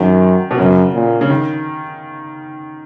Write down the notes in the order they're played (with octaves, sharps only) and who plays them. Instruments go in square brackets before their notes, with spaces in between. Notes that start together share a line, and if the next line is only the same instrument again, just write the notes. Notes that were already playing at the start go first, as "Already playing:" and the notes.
Already playing: [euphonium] F#2 [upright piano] D#3
[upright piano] B2
[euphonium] F#2 [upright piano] C#3
[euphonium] A#2
[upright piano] C#3
D#3